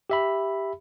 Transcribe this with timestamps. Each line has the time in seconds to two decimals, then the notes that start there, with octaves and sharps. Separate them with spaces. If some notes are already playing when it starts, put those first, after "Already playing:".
0.10 G4 E5 B5